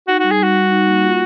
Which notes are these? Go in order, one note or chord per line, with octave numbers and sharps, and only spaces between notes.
D#4 F#4
G3 F#4
G#4
G3 F#4
G3
D#4
A#3
F4